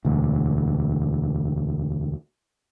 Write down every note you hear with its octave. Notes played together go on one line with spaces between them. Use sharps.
E1 D2